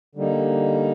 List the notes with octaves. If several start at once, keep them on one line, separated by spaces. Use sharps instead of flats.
D3 G3 A#3 D#4